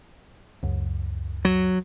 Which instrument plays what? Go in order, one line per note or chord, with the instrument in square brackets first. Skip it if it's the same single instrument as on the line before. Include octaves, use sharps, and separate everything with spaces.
[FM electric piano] C#2 F#2
[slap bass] F#3